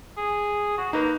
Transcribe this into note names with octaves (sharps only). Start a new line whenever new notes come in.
G#4
F#4
A#3 D#4 B4